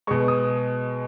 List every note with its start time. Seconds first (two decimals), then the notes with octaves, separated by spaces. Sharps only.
0.07 B2 G#3 C#6
0.28 D#6